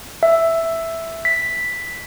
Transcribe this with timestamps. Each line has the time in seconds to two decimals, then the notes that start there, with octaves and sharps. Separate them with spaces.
0.23 E5
1.25 B6